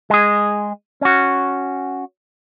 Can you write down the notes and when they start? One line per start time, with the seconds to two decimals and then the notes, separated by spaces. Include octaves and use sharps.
0.10 G#3 G#4
1.01 C#4 F#4